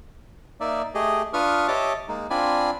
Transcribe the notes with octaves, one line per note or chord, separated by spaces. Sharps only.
A#3 D#4 D5 E5
A3 G4 G#4 D#5
D4 F4 B4 C#6 D#6 F6
G4 C#5 D#5 E5 A5 D6
G#3 A#3 D#4
C4 D4 F4 D5 G#5 B5